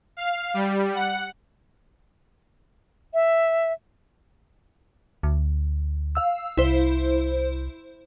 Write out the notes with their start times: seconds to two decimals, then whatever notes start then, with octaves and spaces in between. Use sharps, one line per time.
0.17 F5
0.54 G3
0.94 F#5
3.14 E5
5.23 D2
6.15 F5 E6
6.57 C2 E4 C5